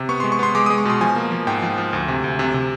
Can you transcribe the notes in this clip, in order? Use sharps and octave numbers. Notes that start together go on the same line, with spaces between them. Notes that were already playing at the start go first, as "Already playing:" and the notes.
Already playing: C3
B3 C#6
G#3 C6
C#6
B3 C6
G#3 D6
G#3 D#6
C#6
B2 C6
F3 G#5
A#3
F3
G#2 G5
F3
F3
D2
C3
D2
C3
C3